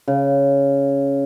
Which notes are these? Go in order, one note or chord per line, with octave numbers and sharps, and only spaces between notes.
C#3